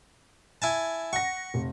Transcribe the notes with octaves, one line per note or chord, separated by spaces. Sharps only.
E4 G#5 A5
F#5 C#6 A#6
F1